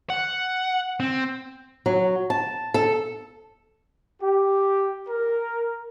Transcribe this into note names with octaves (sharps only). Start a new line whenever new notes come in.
F#5
C4
F#3
A5
A4
G4
A#4